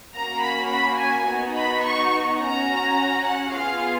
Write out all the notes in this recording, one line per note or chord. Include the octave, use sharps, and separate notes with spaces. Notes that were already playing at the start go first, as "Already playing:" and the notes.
A#3 C#4 F#4 A#5
B5
B5
G#5
B3 D#4 F#4
B5
C#6
C#4 F#4 A#5
F#5
B3 F4 G#4 F5